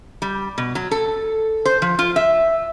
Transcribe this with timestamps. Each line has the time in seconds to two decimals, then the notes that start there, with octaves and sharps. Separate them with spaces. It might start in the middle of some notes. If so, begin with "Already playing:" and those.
0.22 G3
0.58 B2
0.75 F#3
0.91 A4
1.65 C5
1.82 F3
1.99 F4
2.16 E5